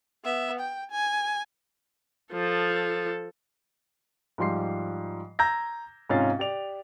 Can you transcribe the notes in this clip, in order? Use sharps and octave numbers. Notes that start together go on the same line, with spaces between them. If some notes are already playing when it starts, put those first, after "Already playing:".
B3 E5
G5
G#5
F3 A4
G#2 F3 G3 C6 C7
A#5 E6 G6 G#6 A#6
G#2 C3 C#4 F4 F5 A6
G4 D5 F7